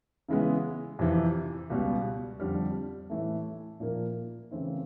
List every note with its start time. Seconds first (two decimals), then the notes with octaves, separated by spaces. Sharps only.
0.29 C#3 E3 G#3 B3
0.99 F2 C3 E3
1.70 C#2 B2 G3
2.40 F2 D3 G3
3.10 A2 E3 A3
3.80 A#2 F3 A#3
4.51 C#3 E3 A3 C4 E4